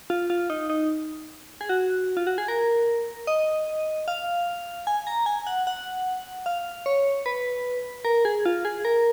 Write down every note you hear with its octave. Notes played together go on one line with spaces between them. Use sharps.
F4
F4
D#4
D#4
G#4
F#4
F4
F#4
G#4
A#4
D#5
F5
G#5
A#5
G#5
F#5
F#5
F5
C#5
B4
A#4
G#4
F4
G#4
A#4